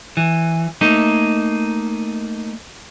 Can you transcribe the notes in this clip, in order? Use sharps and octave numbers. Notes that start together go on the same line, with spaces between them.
E3
A3 A#3 D#4